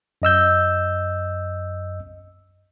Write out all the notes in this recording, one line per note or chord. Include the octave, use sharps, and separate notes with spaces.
F#2 D#5 E6 G6